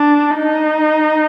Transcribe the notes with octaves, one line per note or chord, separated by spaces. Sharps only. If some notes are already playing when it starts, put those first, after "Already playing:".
Already playing: D4
D#4